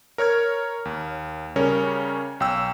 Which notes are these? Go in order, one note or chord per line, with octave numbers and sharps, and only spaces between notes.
A#4 C#5 F6 G#6
D#2
C#3 G3 C#4 A#4 C#5
B1 G5 E6